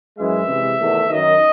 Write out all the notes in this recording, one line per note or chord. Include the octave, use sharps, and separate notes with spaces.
F#2 E3 G#3 E5
C3 E3 G#3
E2 D#3 A3
F#2 D#3 F#3 D#5